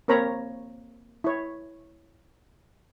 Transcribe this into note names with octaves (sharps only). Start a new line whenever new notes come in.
A#3 C4 A#4 C#5 A#5 B5
E4 C#5